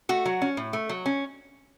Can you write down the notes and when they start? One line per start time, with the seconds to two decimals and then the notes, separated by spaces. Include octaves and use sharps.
0.09 A3 F#4
0.25 F#3
0.42 C#4
0.57 A2
0.73 A3
0.89 F#3
1.06 C#4